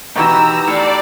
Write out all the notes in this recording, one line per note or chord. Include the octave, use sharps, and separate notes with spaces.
B2 D3 E3 D#4 F#4 G4 A#5 E6
A2 D5